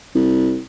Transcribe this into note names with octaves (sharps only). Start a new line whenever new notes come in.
C2